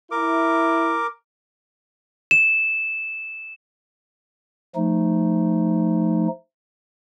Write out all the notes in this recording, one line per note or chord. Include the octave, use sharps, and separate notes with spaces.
E4 A#4 D6
E7
F3 A3 D#4